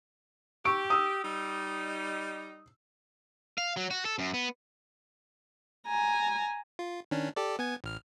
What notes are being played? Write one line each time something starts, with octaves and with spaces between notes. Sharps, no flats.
G4 C#6 E6 D7
D#6 E6
G3 D#4
F5
F#3
F#4
A4
F#2
B3
G#5 A#5
F4
D#3 C#4 D4
G4 A4 D5
B3 G#5 G#6
A1 F6